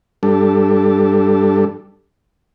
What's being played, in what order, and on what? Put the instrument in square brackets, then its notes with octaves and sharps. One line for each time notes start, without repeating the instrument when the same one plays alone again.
[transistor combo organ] G2 G3 D4 A4